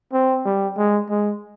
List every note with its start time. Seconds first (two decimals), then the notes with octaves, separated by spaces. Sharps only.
0.13 C4
0.46 G3
0.77 G#3
1.10 G#3